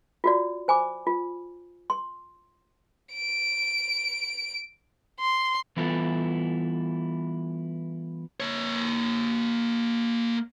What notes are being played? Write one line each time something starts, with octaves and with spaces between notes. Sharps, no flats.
F4 F#4 D5
C5 G#5 B5 D6
F4
C6
D7
C6
E3 G3 B3 E4 F4 A4
A#3 C#5